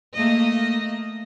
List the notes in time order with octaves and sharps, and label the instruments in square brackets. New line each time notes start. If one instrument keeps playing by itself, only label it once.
[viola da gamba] A3 A#3 D#5